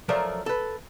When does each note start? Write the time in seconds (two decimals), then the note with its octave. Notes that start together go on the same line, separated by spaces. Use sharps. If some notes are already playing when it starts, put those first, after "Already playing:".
0.09 F3 F#3 A3 A#4 C5 D5
0.46 A4 B4